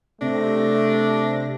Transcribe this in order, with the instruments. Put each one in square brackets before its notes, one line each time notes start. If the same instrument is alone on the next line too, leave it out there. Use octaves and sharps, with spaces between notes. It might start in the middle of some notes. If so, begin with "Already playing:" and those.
[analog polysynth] C3 A#6 [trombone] A3 [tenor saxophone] D4